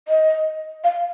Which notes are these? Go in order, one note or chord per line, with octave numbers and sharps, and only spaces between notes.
D#5
F5